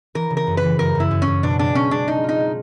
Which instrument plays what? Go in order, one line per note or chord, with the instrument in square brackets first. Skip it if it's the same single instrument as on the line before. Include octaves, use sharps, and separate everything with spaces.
[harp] E3 [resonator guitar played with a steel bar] A#4
[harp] C#3
[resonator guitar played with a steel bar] A#4
[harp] F#2
[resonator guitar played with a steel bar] B4
[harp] E3
[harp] F#2 [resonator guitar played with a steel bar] A#4
[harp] F#2 [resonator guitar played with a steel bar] E4
[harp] F#2
[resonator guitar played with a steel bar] C#4
[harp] F#2
[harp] B2 [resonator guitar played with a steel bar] D4
[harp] G#3 [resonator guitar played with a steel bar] D4
[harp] C4 [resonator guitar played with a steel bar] C#4
[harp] G#3 [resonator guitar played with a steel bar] D4
[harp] G#3 [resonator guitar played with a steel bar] D#4
[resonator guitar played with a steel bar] D#4 [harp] F4
[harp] G#3